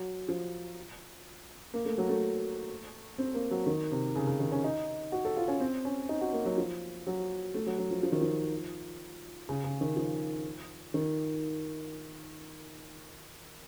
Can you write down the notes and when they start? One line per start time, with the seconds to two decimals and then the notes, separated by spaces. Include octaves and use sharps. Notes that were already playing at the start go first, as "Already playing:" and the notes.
Already playing: F#3
0.29 F3
1.74 A#3
1.85 A3
1.98 F#3
2.09 A3
3.18 C4
3.34 A#3
3.51 F#3
3.67 D#3
3.91 C3
4.16 C#3
4.27 C#3
4.40 D#3
4.52 C#4
4.64 D#4
5.12 F#4
5.25 A4
5.36 F4
5.48 C#4
5.60 C4
5.85 C#4
6.09 D#4
6.21 F#4
6.33 A#3
6.45 F#3
6.58 F3
7.07 F#3
7.54 A3
7.66 F#3
7.78 F#3
7.91 F3
8.03 F3
8.12 D#3
8.21 F3
9.49 C#3
9.64 C#3
9.81 D#3
9.96 F3
10.94 D#3